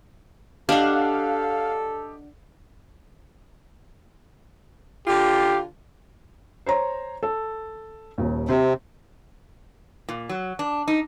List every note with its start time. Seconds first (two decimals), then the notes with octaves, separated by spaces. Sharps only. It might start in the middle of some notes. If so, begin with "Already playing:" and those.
0.69 D4 G4 A4 D#5 F5 F#5
5.07 D3 F4 G4
6.66 C5 C#5 A#5
7.23 A4
8.18 D#1 D#2
8.49 C3 C4
10.08 A#2
10.29 F#3
10.59 D4
10.88 D#4